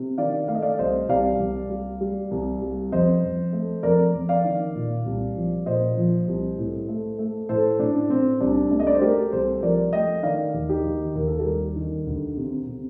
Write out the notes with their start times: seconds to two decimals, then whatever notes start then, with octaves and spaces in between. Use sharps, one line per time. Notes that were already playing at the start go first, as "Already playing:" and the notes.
Already playing: C3
0.18 D#3 D5 F5
0.48 A3 F5
0.55 D#5
0.62 D5 F5
0.79 C2 C5 D#5
1.09 C2 D5 F5
1.40 C2
1.70 G3
2.01 G3
2.31 C2
2.62 G3
2.92 F2 C5 D#5
3.22 F2
3.53 A3
3.83 F2 A#4 D5
4.14 F2
4.29 D5 F5
4.45 D#3
4.75 A#2
5.06 C2
5.36 F3
5.66 A#2 C5 D#5
5.97 F3
6.28 C2
6.58 A2
6.88 A3
7.19 A3
7.49 A2 A4 C5
7.79 A2 D4
8.10 A2 C4
8.41 C2 D4
8.71 A3 D4
8.80 D#5
8.87 D5
8.95 C5
9.01 A3 G4 A#4
9.32 C2 A4 C5
9.62 F3 A#4 D5
9.93 A3 D#5 G5
10.23 D#3 D5 F5
10.54 D#2
10.69 D#4 G4
10.84 D#2
11.15 D#2 A#4
11.27 A4
11.40 G4 A#4
11.45 G3
11.76 D#3
12.07 D2
12.37 C3
12.68 C3